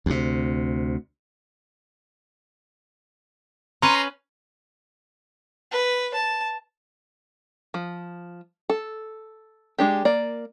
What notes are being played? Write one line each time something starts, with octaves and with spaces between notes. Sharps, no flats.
D2 C3
C#4 B4 A#5 C6
B4
A5
F3
A4
G#3 D4 G4
A#3 D5